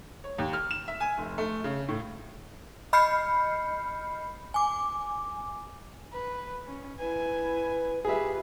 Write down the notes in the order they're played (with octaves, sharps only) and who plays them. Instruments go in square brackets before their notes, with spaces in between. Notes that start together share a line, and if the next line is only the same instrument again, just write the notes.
[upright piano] C#5
D#2
F6
E7
E5
G#5
F1
A3
C#3
A2
[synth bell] D#5 B5 F6 G6 C7 C#7
G#5 D6
[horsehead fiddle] B4
C#4
[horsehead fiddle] E4 G#5 [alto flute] B4
[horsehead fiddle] F4 B4 [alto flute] G4 [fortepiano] G#4 E5